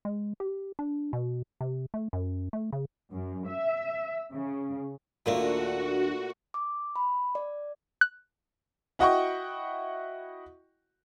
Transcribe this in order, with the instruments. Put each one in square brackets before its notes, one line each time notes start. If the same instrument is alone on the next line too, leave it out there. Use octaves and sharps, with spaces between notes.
[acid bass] G#3
G4
D4
B2
C3
A3
F#2
A3
C#3
[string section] F#2
E5
C#3
[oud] D#2 A#3 D4 [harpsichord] A#2 A3 [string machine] F#4
[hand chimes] D6
B5
D5
[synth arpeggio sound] F#6
[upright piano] E4 F#4 D#5 F#5 G5 C#6